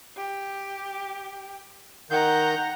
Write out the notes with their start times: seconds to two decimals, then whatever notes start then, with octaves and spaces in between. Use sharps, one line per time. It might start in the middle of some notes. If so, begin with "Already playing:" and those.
0.17 G4
2.10 D#3 F#5 A#5 G6